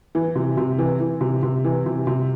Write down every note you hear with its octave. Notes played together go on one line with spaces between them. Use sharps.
E3
C3
C3
E3
E3
C3
C3
E3
C3
C3